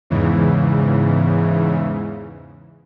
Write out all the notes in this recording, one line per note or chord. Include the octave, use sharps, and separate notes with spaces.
E2 G#2 C#3 E3